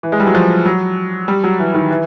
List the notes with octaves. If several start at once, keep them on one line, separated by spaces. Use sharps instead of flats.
E3
G#3
G3
F#3
F3
F#3
G3
F#3
E3
D#3
E3